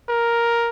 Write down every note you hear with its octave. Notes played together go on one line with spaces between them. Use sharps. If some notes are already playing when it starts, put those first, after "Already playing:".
A#4